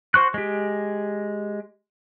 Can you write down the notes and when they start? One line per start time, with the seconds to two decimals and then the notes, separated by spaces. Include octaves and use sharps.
0.14 F#4 C5 C#6 F#6
0.34 G#3 G4